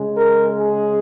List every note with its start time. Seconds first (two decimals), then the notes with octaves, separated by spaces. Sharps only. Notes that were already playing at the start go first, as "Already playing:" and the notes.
Already playing: C#3 G#3
0.15 A#4
0.58 G#4